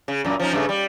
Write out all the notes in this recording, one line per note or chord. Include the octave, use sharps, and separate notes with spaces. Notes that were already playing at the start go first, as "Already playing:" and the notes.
C#3
F#2 A#2
F3 C#4 D#4
G2 C#3 A3
G3